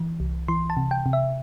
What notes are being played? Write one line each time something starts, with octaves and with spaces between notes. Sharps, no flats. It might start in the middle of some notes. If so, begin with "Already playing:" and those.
Already playing: E3
C2
E3 C6
A5
C3
G5
C3
E5